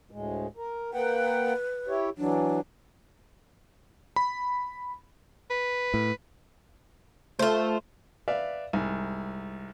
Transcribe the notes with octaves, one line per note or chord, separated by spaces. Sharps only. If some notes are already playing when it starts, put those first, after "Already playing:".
D2 A2 G#3
A#4
A#3 B4 F#5 G5
E4 G4 C#5
E3 F#3 D4
B5
B4
A2
A3 F4 C5
B4 D5 E5 F5
C2 G#2